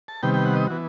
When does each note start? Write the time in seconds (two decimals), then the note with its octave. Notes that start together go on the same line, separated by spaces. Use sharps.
0.08 A5
0.23 C3 D#3 G3 B3 G5
0.34 G5
0.45 F#5
0.56 D#5
0.67 E3 B3 F#4